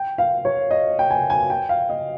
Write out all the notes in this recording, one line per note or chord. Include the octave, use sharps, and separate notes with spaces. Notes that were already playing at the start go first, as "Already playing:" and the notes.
Already playing: G5
F5
C#5
D#5
G5
G#5
G#5
G5
F5
D#5